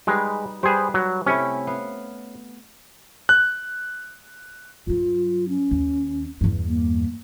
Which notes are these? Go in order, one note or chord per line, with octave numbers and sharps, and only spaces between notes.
G3 G#3 D#4 B4
G3 G#4 B4 C5
F#3
C3 A3 C#4 E4
B3 F5
F#6
G2 F#3 F4
C#4
D#2
E2 G2
A#3